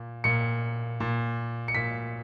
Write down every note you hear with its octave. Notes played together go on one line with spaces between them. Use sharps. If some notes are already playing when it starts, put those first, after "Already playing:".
Already playing: A#2
A#2 C#7
A#2
C#7
A#2 B6